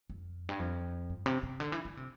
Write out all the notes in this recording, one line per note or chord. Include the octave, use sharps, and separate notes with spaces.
F2
G2
F2
G2
C3
C3
D3
E3
D3
C3